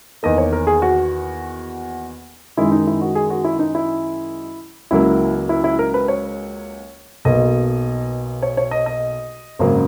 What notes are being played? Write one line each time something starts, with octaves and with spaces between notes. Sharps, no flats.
E2 D#3 A#3 D#5
C#5
A#4
G#4
F#4
F#2 D#3 G#3 E4
D#4
E4
F#4
G#4
F#4
E4
D#4
E4
C#2 C#3 F#3 A#3 E4
E4
E4
A#4
B4
C#5
B1 B2 A#3 D#5
C#5
C#5
D#5
D#5
G#1 F#2 C#3 F#3 A#3